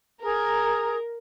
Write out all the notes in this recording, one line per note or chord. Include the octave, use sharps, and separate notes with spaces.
G#4 A#4